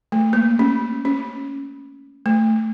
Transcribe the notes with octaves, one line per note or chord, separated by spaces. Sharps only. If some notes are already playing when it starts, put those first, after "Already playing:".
A3
A#3
C#4
C#4
A3